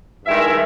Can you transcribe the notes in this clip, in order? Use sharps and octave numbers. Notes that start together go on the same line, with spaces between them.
G2 D#3 G#3 E4 E5